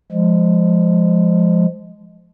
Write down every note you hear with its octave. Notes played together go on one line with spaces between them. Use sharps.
F3 G#3